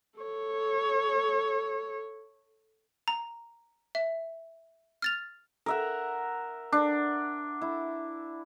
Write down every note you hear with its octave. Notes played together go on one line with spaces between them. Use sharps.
A4 C#5
A#5
E5
F6 A6 F7
A#4 E5 F#5
D4
E4